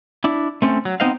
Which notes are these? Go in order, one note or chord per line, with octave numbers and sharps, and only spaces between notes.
D4 E4
A3 C4 C#4 A4
F#3
B3 C4 D#4 C5 D#5 F5